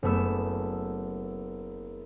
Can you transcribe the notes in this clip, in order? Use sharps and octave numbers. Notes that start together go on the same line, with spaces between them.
F#1 A3 B3 E6